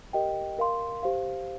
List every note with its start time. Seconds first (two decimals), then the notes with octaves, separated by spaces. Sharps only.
0.13 G4 A#4 D#5 G5
0.58 A#4 F5 C6
1.03 G4 C5 F5